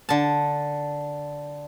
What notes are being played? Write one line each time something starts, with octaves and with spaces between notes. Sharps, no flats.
D3 A5